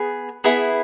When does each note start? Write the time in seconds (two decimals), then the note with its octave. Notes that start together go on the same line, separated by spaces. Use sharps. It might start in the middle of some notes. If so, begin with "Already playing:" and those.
Already playing: B3 G#4
0.44 B3 E4 G#4